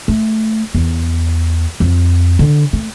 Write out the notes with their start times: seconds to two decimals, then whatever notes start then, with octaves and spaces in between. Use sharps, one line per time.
0.08 A3
0.75 E2
1.80 F2
2.39 D3
2.73 A3